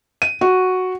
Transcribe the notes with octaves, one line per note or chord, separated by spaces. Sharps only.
D#7
F#4